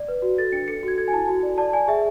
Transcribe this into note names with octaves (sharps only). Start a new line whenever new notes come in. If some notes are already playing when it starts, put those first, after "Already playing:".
Already playing: D5
B4
F#4
A4 A6
D4 C#7
A4 C#7
F#4 G#6
A4 G#6
G#5
E4 A5
F#4
D5
D5 A5
D5 G#5
G#4 E5